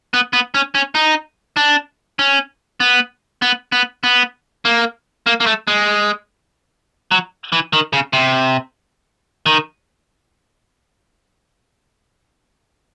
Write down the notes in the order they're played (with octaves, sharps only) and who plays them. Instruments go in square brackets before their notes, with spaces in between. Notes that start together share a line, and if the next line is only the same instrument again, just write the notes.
[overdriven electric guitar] B3
B3
C#4
C#4
D#4
D4
C#4
B3
B3
B3
B3
A#3
A#3
A#3
A3
G#3
F#3
E3
D#3
C#3
C3
D#3